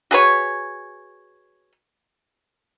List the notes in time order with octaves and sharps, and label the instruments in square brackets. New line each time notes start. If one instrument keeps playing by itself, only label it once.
[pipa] F#4 G#4 B4 C#5